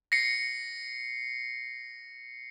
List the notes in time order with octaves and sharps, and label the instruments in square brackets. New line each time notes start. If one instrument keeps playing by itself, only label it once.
[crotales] A#6 C7 C#7